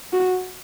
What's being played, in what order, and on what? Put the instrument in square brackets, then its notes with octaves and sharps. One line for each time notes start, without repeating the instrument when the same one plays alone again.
[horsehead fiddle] F#4